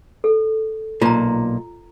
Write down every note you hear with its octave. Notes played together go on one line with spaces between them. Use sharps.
A4
B1 A#2 F4 A#5